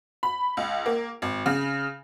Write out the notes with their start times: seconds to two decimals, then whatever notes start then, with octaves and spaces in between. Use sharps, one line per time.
0.23 B5
0.57 C#2
0.86 A#3
1.22 G#1
1.46 C#3